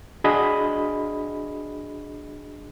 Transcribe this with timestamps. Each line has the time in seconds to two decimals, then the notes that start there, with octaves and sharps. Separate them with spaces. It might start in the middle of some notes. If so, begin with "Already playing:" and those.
0.24 D4 F#4 G#4 D#5 B5